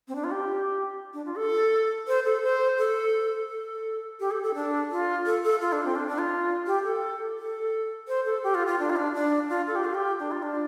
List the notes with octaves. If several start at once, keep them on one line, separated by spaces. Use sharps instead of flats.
C4
D4
F4
G4
D4
F4
A4
C5
A4
C5
A4
A4
G4
A4
A4
D4
F4
A4
A4
F4
D4
C4
D4
D4
F4
G4
A4
A4
C5
A4
G4
F4
F4
D4
F4
D4
D4
F4
A4
G4
F4
G4
D4
F4
D4